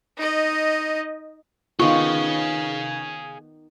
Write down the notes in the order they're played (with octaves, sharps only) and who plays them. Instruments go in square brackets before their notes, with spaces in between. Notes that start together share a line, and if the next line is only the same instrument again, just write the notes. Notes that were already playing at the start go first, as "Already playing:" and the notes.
[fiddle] D#4 D#5
[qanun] D#3 B3 [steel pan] F4 [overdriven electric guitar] G#4 F5 [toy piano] C#6